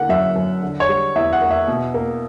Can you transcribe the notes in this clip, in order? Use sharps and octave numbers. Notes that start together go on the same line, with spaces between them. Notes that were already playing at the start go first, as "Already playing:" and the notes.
Already playing: E2 D3 A#3 F#5
F#2 E5
F#2
D3
C#5
G3
E2 E5
F#5
A#3
E5
B2
A#3